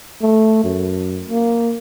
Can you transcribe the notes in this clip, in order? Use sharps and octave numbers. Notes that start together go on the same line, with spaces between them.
A3
F#2
A#3